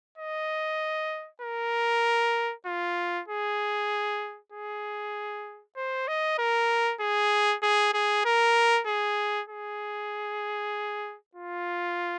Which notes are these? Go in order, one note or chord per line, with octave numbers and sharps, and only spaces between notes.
D#5
A#4
F4
G#4
G#4
C5
D#5
A#4
G#4
G#4
G#4
A#4
G#4
G#4
F4